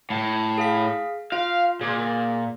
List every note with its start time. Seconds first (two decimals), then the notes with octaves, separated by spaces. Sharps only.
0.10 A2
0.58 G#4 F5 B6
1.32 F4 F5
1.81 A#2 G#4